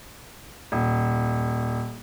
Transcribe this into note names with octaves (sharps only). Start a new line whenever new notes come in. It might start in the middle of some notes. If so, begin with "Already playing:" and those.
D#1